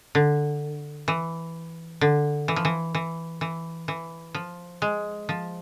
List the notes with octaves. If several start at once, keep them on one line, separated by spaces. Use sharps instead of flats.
D3
E3
D3
E3
F3
E3
E3
E3
E3
F3
G#3
F3